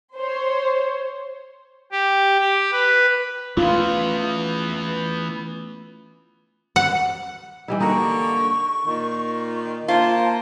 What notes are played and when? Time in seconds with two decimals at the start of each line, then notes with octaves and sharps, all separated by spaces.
0.17 C5 C#5
1.92 G4
2.40 G4
2.72 B4
3.57 E3 A3 B3 C#4 F4
6.76 F#5
7.68 E3 G3 E4 D#5
7.80 D3 A#3 D#4 F#4 C#6
8.85 A#2 D#3
9.88 A#3 F4 C5 A5